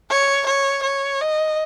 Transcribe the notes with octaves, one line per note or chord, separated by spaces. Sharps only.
C#5
C#5
C#5
D#5